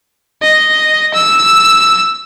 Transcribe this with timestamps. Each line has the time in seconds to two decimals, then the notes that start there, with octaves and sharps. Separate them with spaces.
0.42 D#5
1.14 E6